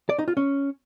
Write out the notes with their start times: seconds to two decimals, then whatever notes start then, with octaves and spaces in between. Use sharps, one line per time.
0.09 D5
0.19 D#4
0.28 F4
0.37 C#4